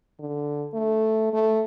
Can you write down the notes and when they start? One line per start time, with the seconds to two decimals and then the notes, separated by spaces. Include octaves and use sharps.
0.19 D3
0.74 A3
1.33 A3